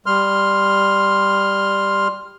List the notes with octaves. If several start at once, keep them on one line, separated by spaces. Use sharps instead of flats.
G3 C6 F6